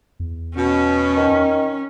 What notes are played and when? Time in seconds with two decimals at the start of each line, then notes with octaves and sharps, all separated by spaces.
0.20 E2
0.56 B2 C#4
1.17 D#3